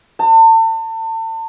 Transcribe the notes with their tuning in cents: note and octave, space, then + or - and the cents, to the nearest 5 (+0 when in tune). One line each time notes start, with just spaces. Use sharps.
A5 +35